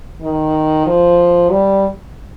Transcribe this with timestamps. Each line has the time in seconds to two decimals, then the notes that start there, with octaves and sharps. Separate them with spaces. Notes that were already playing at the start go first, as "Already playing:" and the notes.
0.22 D#3
0.86 F3
1.51 G3